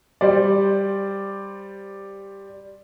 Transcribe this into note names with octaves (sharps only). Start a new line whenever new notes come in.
G3 C5 D5